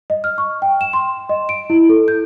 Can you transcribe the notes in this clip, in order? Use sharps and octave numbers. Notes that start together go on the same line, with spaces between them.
D#5
F6
C#6
G5
E7
C6
D#5
D7
E4
A4
G6